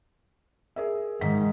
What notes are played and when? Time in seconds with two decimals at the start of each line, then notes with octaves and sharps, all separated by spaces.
0.76 G#4 A#4 E5
1.21 G#2 D#3 G#3 B6